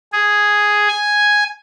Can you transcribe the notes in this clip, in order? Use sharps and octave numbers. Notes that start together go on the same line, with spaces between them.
G#4
G#5